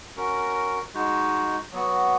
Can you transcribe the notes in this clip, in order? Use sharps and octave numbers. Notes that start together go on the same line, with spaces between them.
C#4 F#4 A#4
G#3 D#4 F#4
F#3 B3 F#4